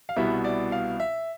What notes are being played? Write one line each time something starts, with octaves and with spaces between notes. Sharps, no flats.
F5
C2 B2 G3 B3 E4 E5
D5
F5
E5